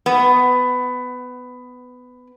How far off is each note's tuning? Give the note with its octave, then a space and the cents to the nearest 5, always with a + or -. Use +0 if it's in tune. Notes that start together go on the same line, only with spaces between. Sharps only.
B3 +15